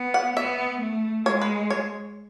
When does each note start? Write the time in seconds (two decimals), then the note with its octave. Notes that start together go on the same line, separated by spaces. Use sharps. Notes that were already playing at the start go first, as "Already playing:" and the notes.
Already playing: B3
0.14 F#5
0.37 B3 E5
0.81 A3
1.26 G#3 C#5
1.42 B4
1.70 C#5